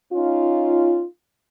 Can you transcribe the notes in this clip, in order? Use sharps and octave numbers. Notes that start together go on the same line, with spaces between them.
C#4 D#4 F4